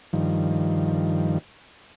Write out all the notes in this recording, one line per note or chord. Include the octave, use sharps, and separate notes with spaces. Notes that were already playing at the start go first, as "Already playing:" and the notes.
G2 D#3 F3